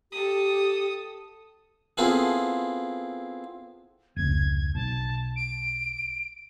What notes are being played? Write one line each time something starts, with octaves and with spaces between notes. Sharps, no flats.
G4 A4 D#6
B3 C4 E4 F4 G#4 A4
F1 C#2 G#6
B1 A5
D7